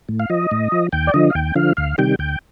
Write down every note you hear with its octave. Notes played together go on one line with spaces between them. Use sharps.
A2
F5
F3 D#5
A2
F3
D#2 G5
D5
D3 F3 D#5
F5
D#2 G5
D3 F3 F5
D2 F5
C3 D#3 G3 G5
D2 G5